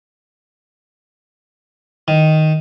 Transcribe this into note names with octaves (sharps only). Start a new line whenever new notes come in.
D#3